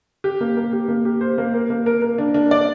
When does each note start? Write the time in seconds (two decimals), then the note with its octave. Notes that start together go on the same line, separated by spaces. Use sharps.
0.24 G4
0.41 A#3
0.57 A#3
0.73 G4
0.88 A#3
1.05 G4
1.21 C5
1.38 A#3
1.53 A#4
1.70 A#3
1.86 A#4
2.02 A#4
2.18 D4
2.34 D4
2.51 D5